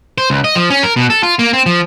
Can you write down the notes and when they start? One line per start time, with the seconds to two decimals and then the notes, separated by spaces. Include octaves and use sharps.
0.18 C5
0.30 C#2
0.44 D#5
0.55 F3
0.70 C#4
0.83 A#4
0.96 B2
1.10 A4
1.23 F4
1.39 A#3
1.53 C4
1.66 F3